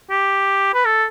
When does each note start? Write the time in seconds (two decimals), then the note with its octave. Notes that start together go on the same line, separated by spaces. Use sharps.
0.10 G4
0.74 B4
0.85 A4